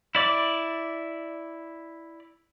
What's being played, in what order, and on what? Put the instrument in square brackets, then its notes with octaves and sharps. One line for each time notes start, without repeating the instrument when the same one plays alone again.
[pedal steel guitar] E4 D5 D6